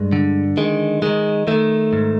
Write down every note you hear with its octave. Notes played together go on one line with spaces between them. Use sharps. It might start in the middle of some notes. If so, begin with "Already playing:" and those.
Already playing: G2 G#3
D3
D#3 G#3
D#3 G#3
D#3 A3
G#2